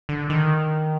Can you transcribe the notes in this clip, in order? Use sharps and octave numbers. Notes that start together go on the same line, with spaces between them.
D3
D#3